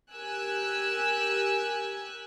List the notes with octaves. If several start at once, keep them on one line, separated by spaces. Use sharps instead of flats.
G4 A#4 G#5 E6 F#6